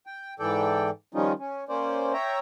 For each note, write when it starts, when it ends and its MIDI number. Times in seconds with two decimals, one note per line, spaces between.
0.07 0.34 79
0.40 0.90 44
0.40 0.90 52
0.40 0.90 69
0.40 0.90 74
0.40 0.90 79
1.14 1.33 51
1.14 1.33 53
1.14 1.33 55
1.14 1.33 61
1.14 1.33 63
1.14 1.33 65
1.39 1.64 61
1.69 2.13 58
1.69 2.13 61
1.69 2.13 72
1.69 2.13 74
2.13 2.39 73
2.13 2.39 76
2.13 2.39 79
2.13 2.39 82